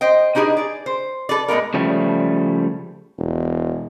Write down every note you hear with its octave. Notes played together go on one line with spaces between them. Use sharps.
C5 D#5 G5
D4 D#4 G4 G#4 B4 D#5
G#4 D5
C5
A4 B4 D5
A2 G#3 B3 F4 A#4
C#3 F3 G3 A3
E1